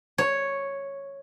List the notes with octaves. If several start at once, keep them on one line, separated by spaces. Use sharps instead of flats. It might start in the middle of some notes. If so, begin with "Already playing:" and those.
C#5